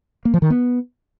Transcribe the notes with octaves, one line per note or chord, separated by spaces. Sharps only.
A#3
F3
D#3
B3